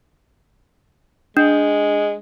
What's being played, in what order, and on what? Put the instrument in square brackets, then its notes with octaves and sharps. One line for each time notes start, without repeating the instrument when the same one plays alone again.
[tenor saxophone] G#3 [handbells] D4